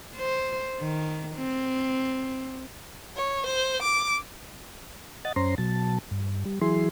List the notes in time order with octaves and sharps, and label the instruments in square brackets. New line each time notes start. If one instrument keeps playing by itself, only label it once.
[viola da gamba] C5
D#3
C4
[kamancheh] C#5
C5
D6
[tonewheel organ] D#5 F#5 A6
F#2 C#4 C5 A#5 C6
B2 F#3 A5
G2
G3
E3 F#3 E4 G#4 C6